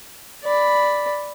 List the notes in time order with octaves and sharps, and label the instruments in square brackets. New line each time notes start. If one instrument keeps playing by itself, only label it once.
[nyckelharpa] D5 B5